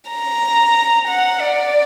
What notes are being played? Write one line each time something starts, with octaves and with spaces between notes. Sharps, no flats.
A#5
F#5
D5